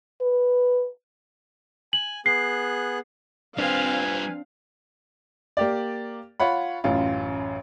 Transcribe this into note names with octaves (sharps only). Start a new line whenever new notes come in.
B4
G#5 F#7
B3 G#4 F#6 C7
G3 C4 D4 F4 B4 F5 G#5
A#3 G4 D5
F4 C#5 F#5 B5
A1 F#2 F4